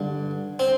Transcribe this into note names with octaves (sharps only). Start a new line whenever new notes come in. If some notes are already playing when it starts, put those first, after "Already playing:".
Already playing: G2 D3
C4